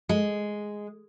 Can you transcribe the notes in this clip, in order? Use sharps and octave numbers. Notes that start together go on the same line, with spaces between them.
G#3